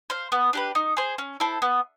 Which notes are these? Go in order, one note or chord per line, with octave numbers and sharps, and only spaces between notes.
C5 F5
B3
D4 G4 B4
D#4
G#4 C5
C#4
E4 A4 C5
B3